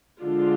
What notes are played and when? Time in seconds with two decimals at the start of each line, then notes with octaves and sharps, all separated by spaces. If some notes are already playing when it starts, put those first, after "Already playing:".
0.22 D3 F3 G#3 D4 F4